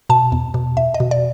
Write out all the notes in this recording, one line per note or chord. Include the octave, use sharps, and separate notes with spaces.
B2 A5
E2
B2
E2 E5
D#5
B2
D5